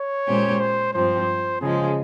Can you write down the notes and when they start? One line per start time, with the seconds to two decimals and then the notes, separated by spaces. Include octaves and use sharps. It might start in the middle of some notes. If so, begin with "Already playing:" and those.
Already playing: C#5
0.26 A#2 G#3 C#4 G4 C5
0.60 C5
0.93 G2 F3 C4 C5
1.61 C#3 F3 G#3 G#4